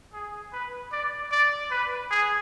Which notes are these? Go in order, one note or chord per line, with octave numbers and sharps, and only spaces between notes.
G#4
B4
D5
D5
B4
G#4